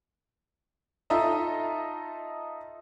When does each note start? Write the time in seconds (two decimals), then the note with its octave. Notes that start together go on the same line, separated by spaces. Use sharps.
1.10 D#4 F4 A4 D#5 E5 A#5